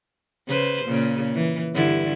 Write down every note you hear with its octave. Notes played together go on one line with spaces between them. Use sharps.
C#3 B4 C5
A#2 C#3
E3
G2 D3 E4